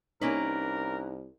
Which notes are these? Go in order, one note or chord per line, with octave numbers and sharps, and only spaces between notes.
C2 A#3 C#4 D#4 A#4 B4